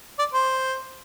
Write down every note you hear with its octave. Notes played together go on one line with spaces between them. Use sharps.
D5
C5